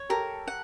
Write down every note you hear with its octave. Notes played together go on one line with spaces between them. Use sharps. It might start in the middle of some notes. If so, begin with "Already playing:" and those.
Already playing: C#5
G4 A4 A#4
F#5